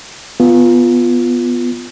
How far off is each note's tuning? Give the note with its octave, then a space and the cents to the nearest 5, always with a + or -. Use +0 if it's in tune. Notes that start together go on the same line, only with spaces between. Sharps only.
B3 +0 F4 +0